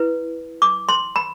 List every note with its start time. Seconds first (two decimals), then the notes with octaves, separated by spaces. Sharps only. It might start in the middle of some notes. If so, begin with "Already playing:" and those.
Already playing: E4 B4
0.62 D6
0.89 C6
1.16 B5